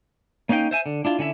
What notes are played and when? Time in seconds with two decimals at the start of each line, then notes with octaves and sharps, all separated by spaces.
0.49 A#3 C#4 D#4 F5 G5
0.71 C5 E5 G#5
0.86 D3
1.05 D4 E4 F4
1.19 D3 C#4 E4 E5